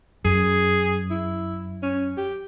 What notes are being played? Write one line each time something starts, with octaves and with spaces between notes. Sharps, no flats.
F#2 G#4
E4
C#4
G4